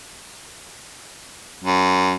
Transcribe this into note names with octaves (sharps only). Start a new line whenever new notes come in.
F#2